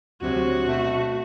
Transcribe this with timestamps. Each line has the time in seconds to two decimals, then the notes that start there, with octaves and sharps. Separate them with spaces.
0.22 D2 C3 F#3 F#4
0.66 B2 A3